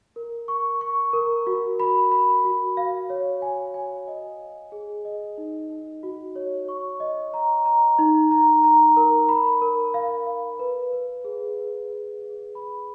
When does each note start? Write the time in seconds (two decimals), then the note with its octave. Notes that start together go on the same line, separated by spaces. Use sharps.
0.16 A#4
0.48 C#6
0.81 C#6
1.13 A#4
1.47 F#4
1.80 B5
2.11 B5
2.44 F#4
2.77 F5
3.10 C#5
3.42 G#5
3.74 G#5
4.08 D#5
4.39 D#5
4.72 G#4
5.05 D#5
5.38 D#4
5.70 D#4
6.03 F#4
6.36 C#5
6.69 C#6
7.00 D#5
7.34 A#5
7.66 A#5
7.99 D#4
8.31 A#5
8.64 A#5
8.97 A#4
9.29 B5
9.62 A#4
9.94 F5
10.27 F5
10.59 B4
10.93 B4
11.24 G#4
11.57 B4
11.89 G#4
12.22 G#4
12.55 B5